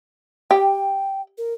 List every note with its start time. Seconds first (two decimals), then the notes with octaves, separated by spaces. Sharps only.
0.51 G4 G5
1.38 A#4